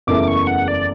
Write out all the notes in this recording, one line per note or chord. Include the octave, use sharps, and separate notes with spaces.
F#1 E2 C#3 E3 A3 D6
C#6
F#5
D5